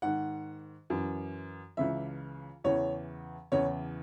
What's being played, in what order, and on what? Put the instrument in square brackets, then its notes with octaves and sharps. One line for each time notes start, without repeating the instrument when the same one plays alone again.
[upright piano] G#2 D#3 F#5
F#2 E3
C#2 C#3 E3 E5
E2 C#3 E3 C#5
E2 C#3 E3 C#5